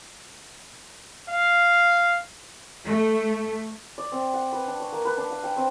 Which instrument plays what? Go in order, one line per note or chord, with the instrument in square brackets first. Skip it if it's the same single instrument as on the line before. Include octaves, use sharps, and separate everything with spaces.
[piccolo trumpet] F5
[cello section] A3
[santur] D5
C4
F#5
B4
D4
C#6
A#3
B4
D4
F5
G5
C4